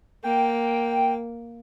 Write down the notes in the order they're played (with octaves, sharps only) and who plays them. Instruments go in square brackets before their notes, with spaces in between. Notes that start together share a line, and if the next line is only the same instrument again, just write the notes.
[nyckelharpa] A#3 [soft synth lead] G5